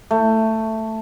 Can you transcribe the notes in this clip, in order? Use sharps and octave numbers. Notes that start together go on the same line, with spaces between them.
A3